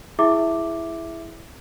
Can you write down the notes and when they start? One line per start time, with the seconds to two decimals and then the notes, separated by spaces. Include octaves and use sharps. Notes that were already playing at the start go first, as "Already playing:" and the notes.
0.19 E4 G#4 E5 D6